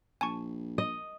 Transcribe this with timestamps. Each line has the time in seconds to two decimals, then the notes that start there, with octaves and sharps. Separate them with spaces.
0.21 A#1 G#5 A5 C#6
0.78 D#5